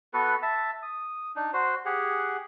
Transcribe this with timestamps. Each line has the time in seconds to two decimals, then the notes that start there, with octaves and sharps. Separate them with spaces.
0.14 B3 F#4 A4 B4
0.42 E5 A5
0.83 D#6
1.36 D4 D#4
1.53 F#4 C5
1.86 G4 G#4 F#5